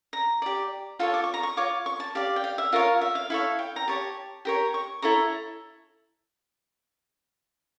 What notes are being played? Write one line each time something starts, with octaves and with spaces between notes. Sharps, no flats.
A#5
G4 D5
F4 A4 C#5 A5
D6
C#6
A#5
C#6
F4 C#5 D6
C#6
A5
G4 D5 F5
G5
F5
E5
F4 A#4 C#5 F5
E5
F5
E4 A4 C#5 F5
G5
A#5
G4 C#5 A5
G4 A#4 C#5
C#6
E4 A4 C#5 A#5